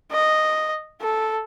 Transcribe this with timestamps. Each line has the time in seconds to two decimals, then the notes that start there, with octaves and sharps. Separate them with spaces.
0.11 D#5
1.01 A4